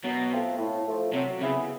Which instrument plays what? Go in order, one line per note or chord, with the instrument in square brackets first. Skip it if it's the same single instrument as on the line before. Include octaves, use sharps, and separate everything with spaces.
[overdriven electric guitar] B2 [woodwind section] F#3
[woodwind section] A3 C4 F4 A4
A2
F3 A3
[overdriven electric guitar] C3 [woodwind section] F#3
[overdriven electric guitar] C#3 [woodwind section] B3 E4 G#4